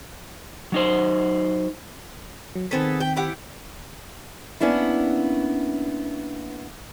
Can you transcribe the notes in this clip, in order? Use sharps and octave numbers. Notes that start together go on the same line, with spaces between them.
F#3 D#4 C5
F#3
D#3 B3 C4 G#4 A4 B6
G5
E4 G4 F#5
A#3 B3 C#4 D4 E4